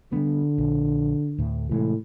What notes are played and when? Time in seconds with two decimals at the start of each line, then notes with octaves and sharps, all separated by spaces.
0.12 D3 G3 A#3 B3
0.58 A#1
1.38 D2 A2
1.71 A2 C3 E3 G#3